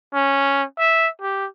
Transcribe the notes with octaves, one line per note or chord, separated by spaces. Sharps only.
C#4
E5
G4